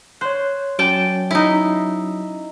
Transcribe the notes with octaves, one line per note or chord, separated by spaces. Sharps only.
C5 C#5 F#6
F#3 C#4 D5 G5 A5
D#4 E4